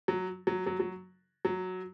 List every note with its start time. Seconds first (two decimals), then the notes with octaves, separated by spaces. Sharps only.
0.08 F#3
0.47 F#3
0.67 F#3
0.80 F#3
1.45 F#3